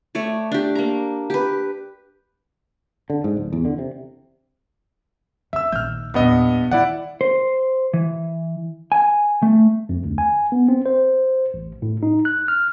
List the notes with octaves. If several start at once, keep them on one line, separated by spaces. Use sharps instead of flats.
A3 C#5 D5
D4 G4
A#3 A#5
G4 B4
D3
G#2
D1
E2
D3
C3
D#2 E5 E6
A#1 D#3 F6 G6
E2 G2 A#2 B3 D#5
D#3 E4 D5 F#5
C5
E3
G#5
A3
F2
D2
G#5
B3
C4
C5
A1
A2
D#4
F#6
F6